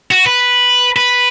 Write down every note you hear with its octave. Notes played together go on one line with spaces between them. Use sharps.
F#4
B4
B4